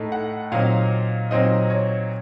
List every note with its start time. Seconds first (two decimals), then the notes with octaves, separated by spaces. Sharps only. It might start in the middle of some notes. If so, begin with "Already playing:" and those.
Already playing: A2 A3 D#4
0.12 F#5
0.52 A#2 F#3 C4 D#4 F5
1.31 A#2 F#3 C4 D#4 D#5
1.70 C#5